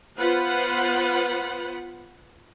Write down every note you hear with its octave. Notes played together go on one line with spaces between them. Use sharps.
B3 F4 B4 C5 F#5